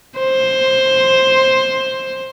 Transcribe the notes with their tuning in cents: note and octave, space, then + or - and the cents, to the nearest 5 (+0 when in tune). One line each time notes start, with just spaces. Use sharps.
C5 +10